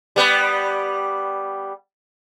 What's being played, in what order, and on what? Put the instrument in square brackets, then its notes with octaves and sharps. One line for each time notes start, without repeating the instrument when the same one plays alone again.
[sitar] G3 B3